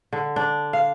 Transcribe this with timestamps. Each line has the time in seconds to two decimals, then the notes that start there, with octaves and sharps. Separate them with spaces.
0.13 D3
0.36 D4
0.73 F5